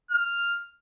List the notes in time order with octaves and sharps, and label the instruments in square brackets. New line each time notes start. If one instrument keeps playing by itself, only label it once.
[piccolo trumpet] F6